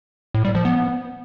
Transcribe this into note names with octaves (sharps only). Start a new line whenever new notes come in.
A2
G3
F3
B3